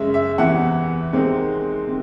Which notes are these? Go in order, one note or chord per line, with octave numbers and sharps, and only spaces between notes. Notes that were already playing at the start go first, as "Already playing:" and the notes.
Already playing: F#2 C#3 G#3 C#4 E5
E5
E2 C3 E3 F#5
C3 D#3 G#3 C4
C3